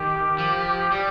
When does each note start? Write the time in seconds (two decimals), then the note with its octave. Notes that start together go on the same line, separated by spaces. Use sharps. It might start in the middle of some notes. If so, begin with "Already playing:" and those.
Already playing: D#3 G4
0.39 F3
0.92 G3